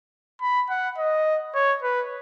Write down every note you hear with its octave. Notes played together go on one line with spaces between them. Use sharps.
B5
F#5
D#5
C#5
B4